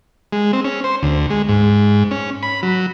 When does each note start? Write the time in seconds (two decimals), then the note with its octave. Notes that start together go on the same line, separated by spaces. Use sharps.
0.33 G#3
0.53 C4
0.65 C#4
0.84 C5
1.03 D2
1.30 G#3
1.48 G#2
2.11 C#4
2.43 B5
2.63 F#3